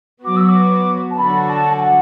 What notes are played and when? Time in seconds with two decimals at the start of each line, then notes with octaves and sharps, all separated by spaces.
0.25 F#3 B3 F#4 D6
0.37 E6
0.49 D6
1.11 A5
1.18 D3 F#3 D4 F#4 A4 B5
1.49 A5
1.71 A5
1.80 F#5